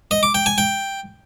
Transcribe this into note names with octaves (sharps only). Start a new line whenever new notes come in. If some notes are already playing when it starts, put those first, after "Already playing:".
D#5
D6
G5
G#5
G5